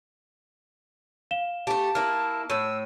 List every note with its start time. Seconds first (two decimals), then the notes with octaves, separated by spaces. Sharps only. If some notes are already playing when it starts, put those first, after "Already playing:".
1.31 F5 E7 G7
1.67 A3 G4 A5
1.95 A#3 E4 F6
2.50 A2 E6 D#7